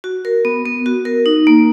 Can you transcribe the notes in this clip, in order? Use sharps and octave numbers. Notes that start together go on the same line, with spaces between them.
F#4
A#4
B3
B3
F#4
A#4
D#4
A#3